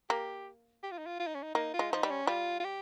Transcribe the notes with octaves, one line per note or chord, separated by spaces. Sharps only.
A#3 G4
G4
F4
D#4
F4
F4
D#4
C#4
D#4
A#3 D#4
F4
G#3
F3 D#4
G3
C#4
G3 F4
F4
G4